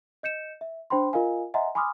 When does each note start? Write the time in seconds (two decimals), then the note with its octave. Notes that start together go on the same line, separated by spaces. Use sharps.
0.23 D#5 G6 C#7 E7
0.61 E5
0.90 D4 C5 G5 B5 C6
1.13 F4 A#4 D#5 F5 G#5
1.54 D#5 E5 F#5 G#5 A#5 C6
1.75 G#5 B5 C6 D6 D#6 F6